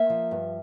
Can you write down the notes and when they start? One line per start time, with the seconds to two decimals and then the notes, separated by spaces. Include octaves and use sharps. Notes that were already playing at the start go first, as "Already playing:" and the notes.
Already playing: A#3 E5
0.10 F3
0.31 G2